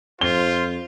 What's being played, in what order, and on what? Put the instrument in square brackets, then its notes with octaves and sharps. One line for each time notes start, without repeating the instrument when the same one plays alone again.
[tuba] F2 [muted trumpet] F4 [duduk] C5 [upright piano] G7